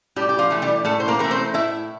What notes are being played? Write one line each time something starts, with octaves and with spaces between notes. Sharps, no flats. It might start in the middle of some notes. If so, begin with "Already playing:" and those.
A2 G3 G4
G4
F3 F4
E3 A3
G3 G4
A2 A3 A4
C5
A#3 A#4
E3 A3 A#4
C4 C5
A2 E4 E5